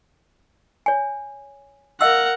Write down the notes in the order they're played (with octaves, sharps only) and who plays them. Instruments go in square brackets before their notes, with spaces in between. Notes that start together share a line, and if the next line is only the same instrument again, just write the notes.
[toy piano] C#5 G#5
[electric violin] A#4 F#5 [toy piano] D#5 F5 E6